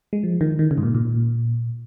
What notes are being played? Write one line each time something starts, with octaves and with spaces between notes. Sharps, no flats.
G#3
F3
D#3
D#3
C#3
G#2
A#2
A#2